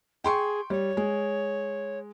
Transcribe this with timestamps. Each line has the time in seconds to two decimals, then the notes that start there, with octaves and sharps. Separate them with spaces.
0.24 G#4 G5 C6 C#6
0.70 G3 C#5
0.97 G#3